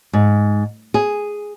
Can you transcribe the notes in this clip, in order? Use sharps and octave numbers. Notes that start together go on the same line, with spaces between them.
G#2
G#4